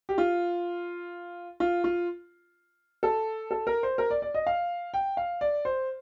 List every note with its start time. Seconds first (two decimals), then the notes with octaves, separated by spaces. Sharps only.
0.09 G4
0.18 F4
1.60 F4
1.84 F4
3.03 A4
3.51 A4
3.67 A#4
3.83 C5
3.98 A#4
4.11 D5
4.22 D5
4.34 D#5
4.47 F5
4.94 G5
5.17 F5
5.41 D5
5.65 C5